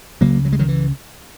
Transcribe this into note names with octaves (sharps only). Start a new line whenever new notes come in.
C#2 C#3 F#3 A#3
F#3
G#3
D#3 F#3
E3